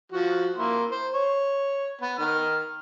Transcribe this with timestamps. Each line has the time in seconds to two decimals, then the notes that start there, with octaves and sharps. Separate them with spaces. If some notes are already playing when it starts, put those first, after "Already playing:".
0.12 F3 F#4
0.57 A#3 E4 C6
0.91 C5
1.14 C#5
2.01 B3
2.19 D#3 F6